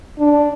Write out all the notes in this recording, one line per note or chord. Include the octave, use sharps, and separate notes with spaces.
D4